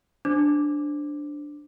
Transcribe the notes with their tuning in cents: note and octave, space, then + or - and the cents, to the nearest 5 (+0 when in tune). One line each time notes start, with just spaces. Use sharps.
D4 +0 C5 +0 D6 +0